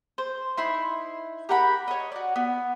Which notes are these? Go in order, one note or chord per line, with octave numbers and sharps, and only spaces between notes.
C5
D#4 E4 C6
G4 A#4 F#5 B5
C#5 D#5
F#4 D5
B3